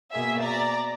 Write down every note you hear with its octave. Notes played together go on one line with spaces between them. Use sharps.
B2 A#3 G#4 E5
D5 A#5